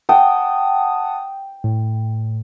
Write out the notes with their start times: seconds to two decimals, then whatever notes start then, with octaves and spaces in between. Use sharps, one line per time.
0.09 F#5 G5 A5 D#6
1.64 A2